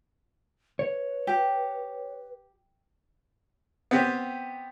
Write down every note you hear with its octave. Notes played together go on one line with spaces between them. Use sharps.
B4 C#5
G4
B3 C4 G4